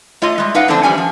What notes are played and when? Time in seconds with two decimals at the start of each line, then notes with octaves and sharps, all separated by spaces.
0.22 A3 F4 C#5 D#5
0.38 G3 G#3
0.54 C#4 D#4 B4 D5 F5 F#5
0.68 D3 F3 A3 C4 D4 C5
0.83 E2 G3 C#4 G#5
0.98 F3